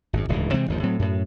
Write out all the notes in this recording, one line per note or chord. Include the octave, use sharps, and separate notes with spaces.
G#1 F#2
D1 C#2 G#2 E3
C3 E3 G#3 C4
G1 D#2 F3
A2 F#3 C4
F#2 A2